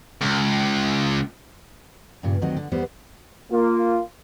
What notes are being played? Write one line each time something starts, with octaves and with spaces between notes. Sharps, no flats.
C#2
G2 A#2 C#3
D2 D#3 F#3 C4 D#5
D3
E2 G3 B3 C5
A#3 F4